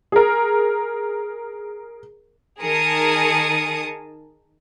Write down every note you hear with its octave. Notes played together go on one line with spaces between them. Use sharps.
G#4 A#4
D#3 G#4 A#4 A5 D#6 C#7